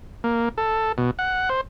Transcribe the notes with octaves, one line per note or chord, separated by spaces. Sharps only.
A#3
A4
B2
F#5
C5